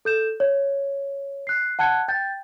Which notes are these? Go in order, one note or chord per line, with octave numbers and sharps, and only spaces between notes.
A4 G6 E7
C#5
F#6 C7
F#5 A5 F#6 G#6 C#7
G5 G6 A6